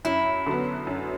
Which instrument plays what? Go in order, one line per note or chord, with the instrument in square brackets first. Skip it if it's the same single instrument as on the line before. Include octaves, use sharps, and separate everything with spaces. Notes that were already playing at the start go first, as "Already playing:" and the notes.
[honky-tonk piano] F#2 [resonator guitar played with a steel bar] E4
[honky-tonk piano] D3 F#3 B3
F#2